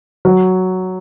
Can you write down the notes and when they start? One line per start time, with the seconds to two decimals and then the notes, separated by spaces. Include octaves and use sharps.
0.25 F#3